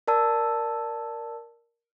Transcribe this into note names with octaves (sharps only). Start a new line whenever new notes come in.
A#4 D5 A5 E6